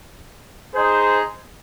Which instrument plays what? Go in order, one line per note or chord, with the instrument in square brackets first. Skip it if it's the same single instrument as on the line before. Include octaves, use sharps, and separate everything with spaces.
[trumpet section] D#4 G#4 C5